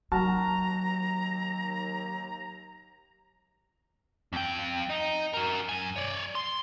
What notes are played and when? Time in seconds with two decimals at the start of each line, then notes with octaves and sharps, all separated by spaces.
0.12 D#2 F#3 F#4 A5 A#5 F6
4.33 F2 G5
4.89 D#4
5.34 F#4 A#4
5.69 F#2 G#5
5.96 C#5 D5
6.35 C6